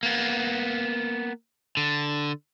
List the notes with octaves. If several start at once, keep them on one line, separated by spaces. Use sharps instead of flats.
A#3 B3
D3